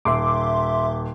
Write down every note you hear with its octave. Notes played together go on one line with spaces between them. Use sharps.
D#1 E5 C6 D6